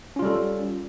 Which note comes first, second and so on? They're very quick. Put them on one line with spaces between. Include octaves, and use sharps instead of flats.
C#4 F4 G3 A4